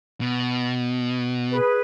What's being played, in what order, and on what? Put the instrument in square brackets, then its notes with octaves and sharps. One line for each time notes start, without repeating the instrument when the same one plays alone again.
[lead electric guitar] B2
[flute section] G#4 B4